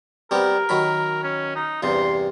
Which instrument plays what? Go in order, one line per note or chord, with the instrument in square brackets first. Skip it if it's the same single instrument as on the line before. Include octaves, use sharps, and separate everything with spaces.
[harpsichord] G3 B3 C4 [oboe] A#4
[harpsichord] D#3 F#3 B5
[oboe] C#4
D#4
[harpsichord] E2 G2 C3 [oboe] C6